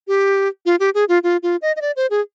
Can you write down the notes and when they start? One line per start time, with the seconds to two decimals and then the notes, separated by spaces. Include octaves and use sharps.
0.08 G4
0.66 F4
0.80 G4
0.95 G#4
1.09 F4
1.23 F4
1.43 F4
1.62 D#5
1.76 D#5
1.81 D5
1.96 C5
2.10 G#4